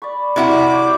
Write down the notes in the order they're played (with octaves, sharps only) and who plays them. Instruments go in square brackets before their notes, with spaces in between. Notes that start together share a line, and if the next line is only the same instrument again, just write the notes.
[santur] D5 B5 C#6
[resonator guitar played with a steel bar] C3 E4 F#4 [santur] A#4 D5
[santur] G3 [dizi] D6
[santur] C5 C#5